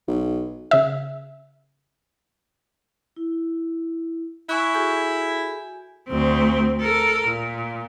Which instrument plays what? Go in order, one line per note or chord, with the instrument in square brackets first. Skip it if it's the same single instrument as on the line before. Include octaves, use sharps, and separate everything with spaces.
[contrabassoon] B1
[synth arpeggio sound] C#3 E5
[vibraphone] E4
[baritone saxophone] E4 [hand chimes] G#5 C#6 F#6
[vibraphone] F#4 G#4 A4 [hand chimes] G#5 G6
[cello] D2 C4
A4 A#4
A#2